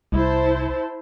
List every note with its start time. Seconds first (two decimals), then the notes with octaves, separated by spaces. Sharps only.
0.12 C2 E4 C5 A5